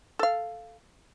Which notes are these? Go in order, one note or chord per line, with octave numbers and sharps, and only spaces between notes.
A4 F5